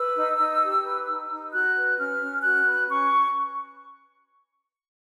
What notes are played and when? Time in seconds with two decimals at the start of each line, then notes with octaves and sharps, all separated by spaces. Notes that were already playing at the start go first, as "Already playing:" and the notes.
Already playing: B4 E6
0.16 D#4
0.38 D#4
0.62 G4
0.84 B4
1.06 D#4
1.29 D#4
1.52 F#4 F#6
1.74 B4
1.97 C#4 F6
2.20 C#4
2.42 F#4 F#6
2.65 B4
2.88 C#4 C#6